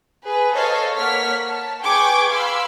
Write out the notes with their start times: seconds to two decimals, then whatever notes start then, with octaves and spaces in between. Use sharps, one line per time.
0.25 G#4 B4
0.55 A4 C5 C#5 D#5 F5
0.95 A#3 C#5 F#5 F6 B6
1.49 A5
1.81 G#4 B4 G5 C#6 D6 G#6
2.31 F5 B5 C6 E6